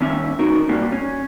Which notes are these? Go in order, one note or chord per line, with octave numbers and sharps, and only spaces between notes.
D#2 C#4 E5
C#4 D#4 F#4 A#4
A#2 G3 A#3 F#4
C#4